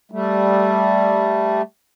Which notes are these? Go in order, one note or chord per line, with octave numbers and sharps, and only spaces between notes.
G3 A3